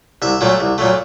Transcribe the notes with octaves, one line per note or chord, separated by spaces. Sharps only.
C2 E5
A#2 F#3 A3
C2
A#2 F#3 A3